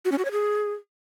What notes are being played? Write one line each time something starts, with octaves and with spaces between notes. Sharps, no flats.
F#4
C#4
F#4
C#5
G#4